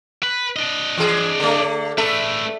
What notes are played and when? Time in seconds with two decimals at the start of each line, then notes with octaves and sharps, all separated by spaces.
0.23 B4
0.56 D4 D#5
0.97 E3 G#4
1.40 D3 A3
1.98 A3 A4 B4 E5